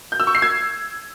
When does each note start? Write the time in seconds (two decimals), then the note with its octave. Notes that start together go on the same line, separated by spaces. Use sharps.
0.12 G6
0.20 E6
0.27 C#6
0.35 C7
0.42 G#6